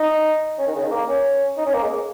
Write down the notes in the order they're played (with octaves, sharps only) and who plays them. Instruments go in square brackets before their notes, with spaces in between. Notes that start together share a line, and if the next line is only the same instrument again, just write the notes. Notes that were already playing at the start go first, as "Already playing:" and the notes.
Already playing: [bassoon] D#4
C#4
D#3
C#3
D#3
A#3
C#4
D#4
C#4
A#3
G#3